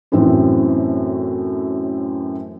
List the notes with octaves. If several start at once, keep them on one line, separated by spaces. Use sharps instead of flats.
F#2 A2 E3 C4 F#4